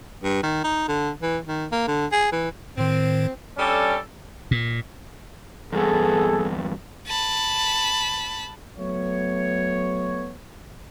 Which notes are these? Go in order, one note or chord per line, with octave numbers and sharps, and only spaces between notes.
G2
D#3
D#4
D3
E3
D#3
A#3
D3
G#4
E3
A2 D#3 C4
G3 C#4 D4 A4
A#2
E2 G2 B3 G#4 A4
A5 B5
F#3 A3 B3 C#5